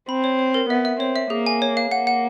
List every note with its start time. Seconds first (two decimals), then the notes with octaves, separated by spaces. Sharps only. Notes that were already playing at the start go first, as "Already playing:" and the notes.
0.09 C4 B5
0.24 C#5
0.39 C#5
0.54 A#4
0.69 B3 E5
0.85 E5
1.00 C4 C#5
1.16 E5
1.30 A#3 G#4
1.46 G#5
1.62 C#5
1.77 F5
1.91 A#3 F#5
2.07 F#5